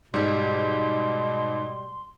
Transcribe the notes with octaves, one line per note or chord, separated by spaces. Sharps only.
G#2 B2 G3 G4 C6